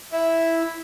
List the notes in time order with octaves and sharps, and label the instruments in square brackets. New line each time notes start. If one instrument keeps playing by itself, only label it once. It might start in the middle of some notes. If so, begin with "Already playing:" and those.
[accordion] E4